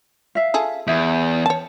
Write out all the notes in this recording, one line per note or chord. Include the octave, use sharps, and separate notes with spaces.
E5 F5
F4 G#4 A4
E2 B4 E5
C#5 A5